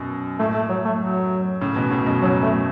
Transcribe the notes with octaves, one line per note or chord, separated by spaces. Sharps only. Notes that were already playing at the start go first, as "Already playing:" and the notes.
Already playing: F#2 B2
A2 A3
A3
F#3
A3
F#3
A2 C#3
B2 E3
A2 C#3
F#2 B2
A2 C#3 F#3
A3